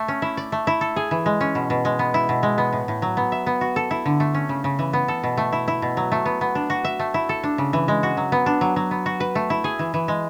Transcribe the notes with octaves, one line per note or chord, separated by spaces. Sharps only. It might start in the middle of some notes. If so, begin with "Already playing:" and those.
Already playing: A3
C#4
E4
D5
A3
E4
A4
G#4
E3
G#3
C#4
B2
B2
G#3
B3
E4
B2
G#3
B3
A2
A2
F#3
B3
E5
B3
F#4
A4
E4
D3
A3
C#4
C#3
C#3
E3
B3
A4
B2
A3
E4
E4
B2
F#3
A3
B3
B3
D4
F#4
E5
A3
E4
A4
D4
C#3
E3
G#3
F#4
F#3
B3
D4
F#3
F#3
B3
F#4
B4
A3
E4
G#4
E3
E3
G#3